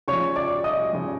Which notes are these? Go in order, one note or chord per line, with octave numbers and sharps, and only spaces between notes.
C#3 F3 C#5 C#6
D5 D6
D#5 D#6
C#3 F3